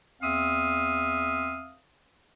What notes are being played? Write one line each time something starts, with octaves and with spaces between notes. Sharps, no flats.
E2 C4 E5 F5 D#6